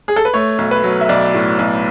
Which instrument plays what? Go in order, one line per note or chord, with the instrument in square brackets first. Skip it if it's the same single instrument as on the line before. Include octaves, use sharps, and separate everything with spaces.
[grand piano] G#4
A4
B4
A3 C#5
B1
B4
F#3
E5
B1 D5
A2
B1